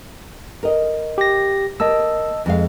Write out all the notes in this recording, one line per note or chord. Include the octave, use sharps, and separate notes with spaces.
A#4 D#5
G4 A#6
A#3 D#5 A5 E6
F2 G#3 F5